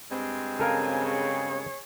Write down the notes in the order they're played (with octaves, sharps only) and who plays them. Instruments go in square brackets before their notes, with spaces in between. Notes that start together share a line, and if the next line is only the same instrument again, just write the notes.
[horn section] G2 G#3 C4
[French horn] C#3 [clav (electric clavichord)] A4 A#4 F5 [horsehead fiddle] G#5
[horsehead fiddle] G#4 C#5